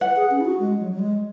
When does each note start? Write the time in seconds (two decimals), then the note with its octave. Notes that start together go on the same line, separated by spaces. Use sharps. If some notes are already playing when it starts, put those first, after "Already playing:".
0.01 B4 F#5
0.16 G#4
0.31 C#4
0.41 E4
0.45 F#4
0.60 G#3
0.80 F#3
0.92 F#3
0.99 G#3